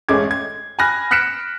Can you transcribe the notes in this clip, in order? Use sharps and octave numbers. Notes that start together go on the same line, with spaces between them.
A1 G#3 A3 C#4 D6 G#6
G#6
G#5 B5 F6 F#6 A#6
F6 F#6 B6 C#7 D7 E7